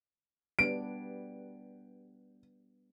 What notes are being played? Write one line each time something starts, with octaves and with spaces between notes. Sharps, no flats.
G3 B3 D4 D7